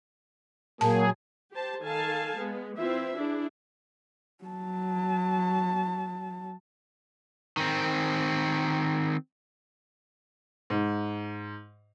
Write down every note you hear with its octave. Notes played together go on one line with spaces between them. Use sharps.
A#2 F#3 A#3 G#4 A5
G4 C5 A5
D#3 A4 F5 G#5 A5
G#3 B3
E3 C4 E4 F4 E5
D4 E4 G#4
F#3 A5
D#3 C4
G#2